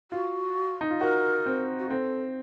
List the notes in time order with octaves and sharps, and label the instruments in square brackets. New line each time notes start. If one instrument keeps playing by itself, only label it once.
[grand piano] F4 [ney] F#4
[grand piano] D#4
F4
[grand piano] F#4 [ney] A#4
[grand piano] C4
[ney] F#4
[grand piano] C4 [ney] A4